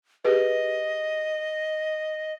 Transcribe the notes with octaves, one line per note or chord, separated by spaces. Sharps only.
G4 G#4 B4 D#5